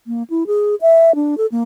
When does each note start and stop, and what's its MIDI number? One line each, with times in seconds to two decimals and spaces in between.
0.07 0.23 58
0.30 0.44 64
0.47 0.75 68
0.81 1.15 76
1.15 1.35 62
1.38 1.46 69
1.52 1.63 58